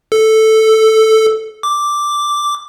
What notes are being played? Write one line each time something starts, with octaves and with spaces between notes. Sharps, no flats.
A4
D6